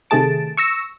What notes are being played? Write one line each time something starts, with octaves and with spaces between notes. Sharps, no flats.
C3 D#3 A3 G#4 A5 D7
C#6 E6 A#6